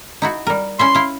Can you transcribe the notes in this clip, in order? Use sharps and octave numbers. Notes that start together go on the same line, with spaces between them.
D#4 E4 F#4
G3 A#4
C#4 E4 E5 C6
E4 F5